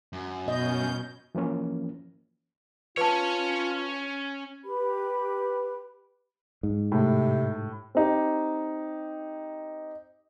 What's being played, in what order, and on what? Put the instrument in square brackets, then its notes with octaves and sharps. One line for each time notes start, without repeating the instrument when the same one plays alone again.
[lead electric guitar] F#2
[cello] B2 [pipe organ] C#4 G6 [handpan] D#5
[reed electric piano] E3 F3 A#3 C#4
[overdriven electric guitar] C#4 C#5 [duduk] F4 [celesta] B4 A5
[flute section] G4 B4 B5
[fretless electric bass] G#2
[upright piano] A2 [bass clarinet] C3
[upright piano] C4 D#4 G4